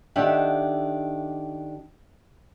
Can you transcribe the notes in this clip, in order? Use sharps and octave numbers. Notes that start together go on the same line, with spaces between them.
D#3 D4 G4 A4 E5 F#5